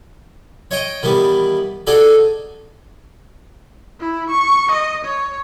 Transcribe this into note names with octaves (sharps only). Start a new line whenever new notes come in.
C#5 D#5 G5
D#3 E3 G3 B3
D4 D#4 F#4 G#4 A4 D5
E4
C#6
D#5
C#5